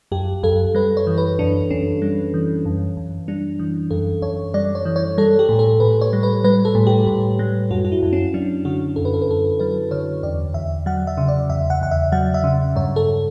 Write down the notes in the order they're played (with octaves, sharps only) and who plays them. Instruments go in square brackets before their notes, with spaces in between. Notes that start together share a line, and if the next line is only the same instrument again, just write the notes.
[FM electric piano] F#2 G4
F#2 A4
G3 B4
C#5
E3
B4
F#2 D4
F#2 C#4
G3
E3
F#2
F#2
G3 D4
E3
F#2 A4
F#2 C#5
G3 D5
C#5
E3
C#5
G3 A4
G4
A2
A4
A2 B4
C#5
G3
B4
G3 B4
A4
A2
G4
A2
G3
F#2 F#4
F#4
E4
F#2
C#4
F#3 D4
D3 F#4
F#2 A4
B4
A4
B4
F#2 A4
F#3 B4
D3 C#5
E2 D5
E2 E5
F#3 F#5
E5
C#3
D5
E2 E5
F#5
E2 F#5
E5
F#3 F#5
E5
C#3
G2 C#5
A4